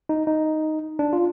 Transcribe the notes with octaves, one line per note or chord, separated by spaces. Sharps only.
D#4
D#4
D4
F4